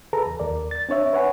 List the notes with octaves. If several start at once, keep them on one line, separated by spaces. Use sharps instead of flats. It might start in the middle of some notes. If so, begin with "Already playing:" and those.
G#4 A4 B4 A#5
E2
D#2 A#4 D5
A6
C4 D4 C#5 E5
B4 C#5 F#5 G#5